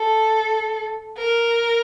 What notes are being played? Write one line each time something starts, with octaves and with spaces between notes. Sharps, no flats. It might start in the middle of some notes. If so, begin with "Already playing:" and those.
Already playing: A4
A#4